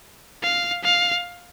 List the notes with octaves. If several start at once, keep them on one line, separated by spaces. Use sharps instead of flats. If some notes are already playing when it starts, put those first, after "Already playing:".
F5
F5